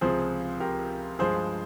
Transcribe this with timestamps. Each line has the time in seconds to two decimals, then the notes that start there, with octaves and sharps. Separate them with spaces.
0.01 C#2 C3 F3 G#4 C5
0.60 G4 A#4
1.19 G2 F3 G#3 G#4 C5